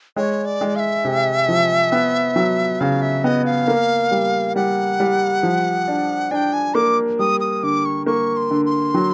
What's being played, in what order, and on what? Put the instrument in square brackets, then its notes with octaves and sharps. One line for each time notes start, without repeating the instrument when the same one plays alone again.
[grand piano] G#3 [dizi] C#5
[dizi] D5
[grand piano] G#3
[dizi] F5
E5
[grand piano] C3
F3
B3
F#3
[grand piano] C#3 [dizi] F5
[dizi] E5
[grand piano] B3 [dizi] D#5
[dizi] F5
[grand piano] A#3
G3
[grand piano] G3 [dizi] F#5
[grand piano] G3
F3
D4
[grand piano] D4 [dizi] G#5
[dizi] G5
G#5
[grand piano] A#3 [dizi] D6
[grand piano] G3 [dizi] D#6
[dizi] D#6
[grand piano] D3 [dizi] D6
[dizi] C#6
[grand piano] A#3 [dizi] C#6
[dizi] C6
[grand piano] D3
[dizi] C6
[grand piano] F#3